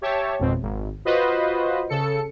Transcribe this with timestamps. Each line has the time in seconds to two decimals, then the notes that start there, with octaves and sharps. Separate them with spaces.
0.02 G4 C#5 E5 A5
0.39 G#1 F2 B2 C4
0.62 G#1
1.05 F4 F#4 B4 C5 D#5
1.89 C#3 A4 C#7